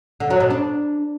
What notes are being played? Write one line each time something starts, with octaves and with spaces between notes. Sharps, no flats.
D3
F#3
B2
D4